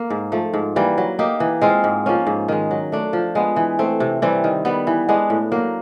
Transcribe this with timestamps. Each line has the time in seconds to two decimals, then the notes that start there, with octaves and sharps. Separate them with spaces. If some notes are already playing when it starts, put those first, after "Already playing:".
Already playing: A#3
0.10 G#2
0.32 F3 A3
0.53 G#2
0.76 E3 G3 A#3
0.98 F#3
1.19 A#3 D#4 G4
1.40 E3
1.61 G#3 C4 F4
1.84 G#2
2.06 F3 A#3 C#4
2.27 G#2
2.48 D#3 G#3
2.71 F#3
2.92 A3 D4
3.13 F3
3.35 G#3 B3
3.56 E3
3.79 A3 C4
4.00 C3
4.22 E3 G3 C4
4.44 D#3
4.65 G3 B3
4.87 E3
5.09 G#3 B3 D4
5.30 A2
5.52 F#3 A#3